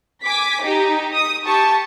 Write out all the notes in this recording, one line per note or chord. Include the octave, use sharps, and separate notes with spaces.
G#5 D6 B6
D#4 G4
D#6
G4 A5 C#6